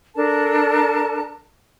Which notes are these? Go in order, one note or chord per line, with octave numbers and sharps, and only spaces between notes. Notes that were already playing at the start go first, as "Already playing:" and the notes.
D4 A4 A#4 A5